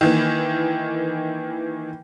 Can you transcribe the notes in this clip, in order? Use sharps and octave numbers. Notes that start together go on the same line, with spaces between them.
D#3 E3 A#3